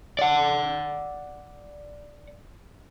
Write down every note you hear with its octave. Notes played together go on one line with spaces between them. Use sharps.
D5 F#5